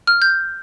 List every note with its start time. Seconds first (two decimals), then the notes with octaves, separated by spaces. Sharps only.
0.07 F6
0.22 G6